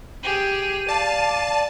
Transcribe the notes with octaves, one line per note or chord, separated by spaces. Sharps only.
G4 G#4 D#7
D5 F5 A5